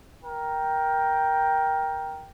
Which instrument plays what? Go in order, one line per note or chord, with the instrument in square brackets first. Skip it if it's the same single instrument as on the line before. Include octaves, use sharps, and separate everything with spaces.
[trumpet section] A#4 G5